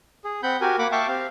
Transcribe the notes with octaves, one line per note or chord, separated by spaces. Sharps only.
G#4
C4 F#5 B5 G6
F#4 G4 A#4 G#5
A#3 F#5 B5 D6
E5 F5 G5 A5 C#6 D6
C4 G4 F5